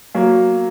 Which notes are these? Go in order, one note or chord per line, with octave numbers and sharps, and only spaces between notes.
F#3 A#3